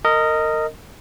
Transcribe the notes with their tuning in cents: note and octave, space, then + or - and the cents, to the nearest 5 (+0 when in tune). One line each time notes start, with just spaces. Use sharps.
A#4 -25 D#5 +0